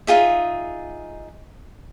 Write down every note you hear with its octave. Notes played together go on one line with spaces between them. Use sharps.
D#4 F4 G#4 E5